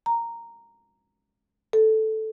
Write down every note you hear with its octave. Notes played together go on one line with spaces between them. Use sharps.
A#5
A4